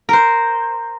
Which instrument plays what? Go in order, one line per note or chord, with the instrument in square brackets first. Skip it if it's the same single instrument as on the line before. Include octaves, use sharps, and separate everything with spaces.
[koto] A#4 C5